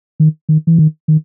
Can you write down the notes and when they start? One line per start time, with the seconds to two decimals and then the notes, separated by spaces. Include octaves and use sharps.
0.20 D#3
0.49 D#3
0.67 E3
0.78 D#3
1.08 D#3